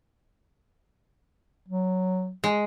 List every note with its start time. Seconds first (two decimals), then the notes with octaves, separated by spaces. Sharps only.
1.69 F#3
2.44 G#3